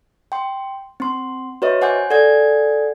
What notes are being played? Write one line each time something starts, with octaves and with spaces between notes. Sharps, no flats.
G5 C6
C4 C6
F#4 B4 C#5 D#5 E5
C5 F#5 G#5 D6 G6
A4 D5 F#5 G#5 G#6